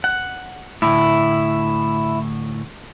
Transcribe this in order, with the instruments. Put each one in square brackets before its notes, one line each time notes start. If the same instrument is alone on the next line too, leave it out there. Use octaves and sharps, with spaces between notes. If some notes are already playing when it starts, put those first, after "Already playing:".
[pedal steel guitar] F#5
[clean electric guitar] D2 A2 [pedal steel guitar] E4